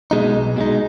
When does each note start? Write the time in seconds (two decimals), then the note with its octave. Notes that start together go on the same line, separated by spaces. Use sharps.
0.11 B2 G#3 D#4
0.34 B1
0.56 B2 G#3 D#4